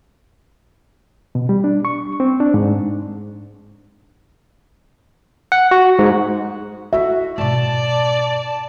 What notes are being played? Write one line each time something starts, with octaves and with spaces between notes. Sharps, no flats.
B2
G3
D4
C#6
C4
D4
G#2
F#5
F#4
G#2
D#4 E4 F#4 E5
G#2 B2 D5 A5